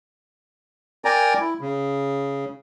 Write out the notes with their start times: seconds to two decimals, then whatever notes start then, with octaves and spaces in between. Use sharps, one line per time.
1.05 A#4 D5 G5 G#5 A#5
1.40 E4
1.61 C#3